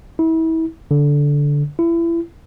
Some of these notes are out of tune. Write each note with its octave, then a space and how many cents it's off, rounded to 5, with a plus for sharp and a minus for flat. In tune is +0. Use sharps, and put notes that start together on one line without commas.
E4 -30
D3 -15
E4 +30